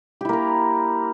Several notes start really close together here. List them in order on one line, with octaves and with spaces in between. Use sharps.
G4 E4 A#3 A#4